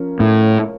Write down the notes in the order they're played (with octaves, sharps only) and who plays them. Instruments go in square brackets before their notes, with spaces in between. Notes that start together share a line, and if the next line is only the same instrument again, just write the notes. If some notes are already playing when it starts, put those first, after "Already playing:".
Already playing: [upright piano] F3 C#4 A#4
[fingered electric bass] A2